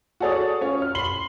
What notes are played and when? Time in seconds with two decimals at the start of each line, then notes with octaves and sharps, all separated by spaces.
0.20 F#4 G#4 A4 C#5 D5 D#6
0.61 C#4 F4 C#5
0.82 F6
0.95 B5 C6 C7 F#7 G7